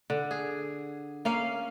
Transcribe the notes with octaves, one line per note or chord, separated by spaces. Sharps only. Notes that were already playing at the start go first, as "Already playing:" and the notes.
D3
G#4
A#3 C#4 F5